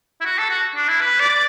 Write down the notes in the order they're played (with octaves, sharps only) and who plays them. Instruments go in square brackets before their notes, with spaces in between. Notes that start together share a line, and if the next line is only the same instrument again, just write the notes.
[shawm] E4
F#4
A4
F#4
D4
E4
B4
D5